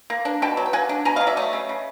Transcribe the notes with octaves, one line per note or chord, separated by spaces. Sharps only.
A#3
D4
B2 G5 A5
F#3
G5
A#3 F#5 G#5
D4
B2 G#5 A#5
F#3 D#5 F5
D5 E5
A3 C#5 D#5
C#3
C#3